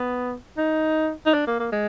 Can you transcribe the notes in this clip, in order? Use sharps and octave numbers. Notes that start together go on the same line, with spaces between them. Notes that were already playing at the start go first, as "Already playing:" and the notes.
Already playing: B3
D#4
D#4
D4
A#3
A#3
G#3